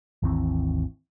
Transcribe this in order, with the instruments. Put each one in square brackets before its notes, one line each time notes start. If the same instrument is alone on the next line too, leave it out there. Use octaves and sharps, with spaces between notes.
[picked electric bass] G#1 D#2 E3 C4